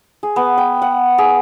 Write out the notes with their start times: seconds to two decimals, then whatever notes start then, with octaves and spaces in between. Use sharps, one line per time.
0.23 G#4
0.36 B3
0.58 G5
0.82 F#5
1.18 G#4